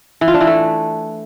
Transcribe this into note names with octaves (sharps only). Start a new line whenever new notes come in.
E3
F4
D4
E3
A3